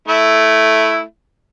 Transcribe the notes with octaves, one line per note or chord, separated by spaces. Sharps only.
A3 E4